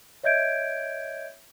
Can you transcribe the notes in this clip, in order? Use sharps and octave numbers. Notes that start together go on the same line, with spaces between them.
C#5 D#5 E5 G6 G#6 D7